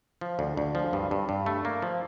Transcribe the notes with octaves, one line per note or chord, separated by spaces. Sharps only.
F3
D2
D2
F3
G2
G2
G2
A3
A#3
F3